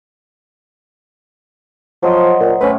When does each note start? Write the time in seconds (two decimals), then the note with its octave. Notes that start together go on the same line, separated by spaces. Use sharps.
2.03 F3 F#3 C5 D#5
2.41 A#2
2.61 A2 C#4 B4 C#5